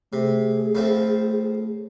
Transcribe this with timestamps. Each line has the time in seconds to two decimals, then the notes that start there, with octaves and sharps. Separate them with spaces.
0.13 C3 A3 G#4
0.75 A2 F3 C4